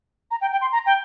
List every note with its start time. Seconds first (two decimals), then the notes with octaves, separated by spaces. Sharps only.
0.31 A#5
0.41 G5
0.52 G5
0.61 C6
0.72 A#5
0.86 G5